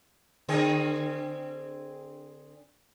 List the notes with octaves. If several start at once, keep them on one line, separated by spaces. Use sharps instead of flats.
D3 C4 G#4